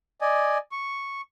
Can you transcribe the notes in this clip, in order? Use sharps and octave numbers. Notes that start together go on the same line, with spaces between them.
D5 D#5 G#5
C#6